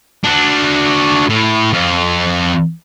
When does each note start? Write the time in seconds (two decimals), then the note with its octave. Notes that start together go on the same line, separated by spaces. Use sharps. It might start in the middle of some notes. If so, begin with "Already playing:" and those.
0.24 D4 F#4
1.30 A2
1.73 F2 F4